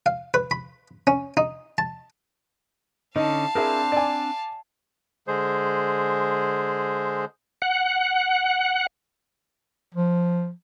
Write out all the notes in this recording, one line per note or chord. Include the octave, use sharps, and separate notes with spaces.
F5
B4
B5
C#4
D#4
A5
D3 C#4 D#4 F5 A5
C4 D4 E4 G#4 A#4 C5
D5 G#5
D3 G#3 G#4 C5
F#5
F3